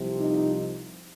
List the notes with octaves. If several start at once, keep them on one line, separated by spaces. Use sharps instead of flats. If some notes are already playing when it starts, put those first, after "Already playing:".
Already playing: C2 C3 F3
D#4